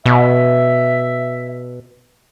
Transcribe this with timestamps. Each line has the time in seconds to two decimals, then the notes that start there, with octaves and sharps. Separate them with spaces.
0.06 B2 E5